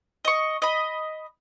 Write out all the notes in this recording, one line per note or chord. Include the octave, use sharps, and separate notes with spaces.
D#5 C#6
D#5 B5